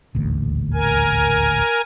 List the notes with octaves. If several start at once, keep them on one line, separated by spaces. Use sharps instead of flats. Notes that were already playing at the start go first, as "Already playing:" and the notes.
D#1 A1 D2
A#4 G#5